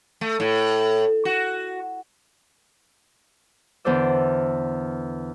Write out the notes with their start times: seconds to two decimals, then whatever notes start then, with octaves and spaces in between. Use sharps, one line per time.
0.21 A3
0.40 A2
1.25 F#4
3.85 E2 D3 C5 D5 E6